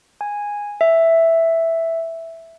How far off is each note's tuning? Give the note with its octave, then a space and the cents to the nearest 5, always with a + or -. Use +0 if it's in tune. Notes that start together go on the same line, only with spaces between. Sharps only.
G#5 -10
E5 +0